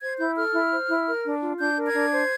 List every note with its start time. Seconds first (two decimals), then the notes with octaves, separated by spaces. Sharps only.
0.02 C5 G#6
0.19 E4 G6
0.37 A4 F6
0.53 E4
0.71 C5
0.89 E4
1.06 A#4
1.24 D4
1.41 F4
1.59 D4 G6
1.77 A#4
1.85 G#6
1.94 D4
2.12 C5